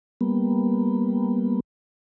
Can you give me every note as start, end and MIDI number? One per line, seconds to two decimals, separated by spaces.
0.21 1.60 55
0.21 1.60 58
0.21 1.60 59